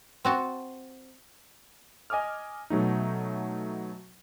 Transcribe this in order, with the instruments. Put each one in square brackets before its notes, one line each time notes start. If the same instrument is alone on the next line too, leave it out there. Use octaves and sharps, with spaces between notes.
[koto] C4 F#4 A5
[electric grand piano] D#5 G#5 D6 D#6 F6
B2 F#3 A3 D#4